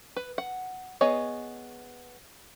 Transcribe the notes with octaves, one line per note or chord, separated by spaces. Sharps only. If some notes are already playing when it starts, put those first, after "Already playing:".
B4
F#5
B3 G#4 C#5 D#5